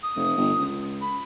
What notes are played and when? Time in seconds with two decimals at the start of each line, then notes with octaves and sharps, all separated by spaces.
0.03 D#6
0.16 F1
0.37 G1
0.57 C#2
1.01 B5